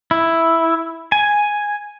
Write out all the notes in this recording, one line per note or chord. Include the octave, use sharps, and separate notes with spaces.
E4
G#5